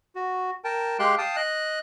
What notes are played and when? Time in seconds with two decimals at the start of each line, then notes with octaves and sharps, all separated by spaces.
0.15 F#4
0.64 A#4 G5 A5
0.99 G#3 G4 F5 G5 C6 F#6
1.18 F5 G5 A5 D#6
1.36 D#5 F#6